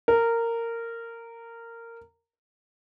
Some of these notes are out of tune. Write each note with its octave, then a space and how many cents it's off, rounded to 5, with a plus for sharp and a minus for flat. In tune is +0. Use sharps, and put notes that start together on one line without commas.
A#4 -15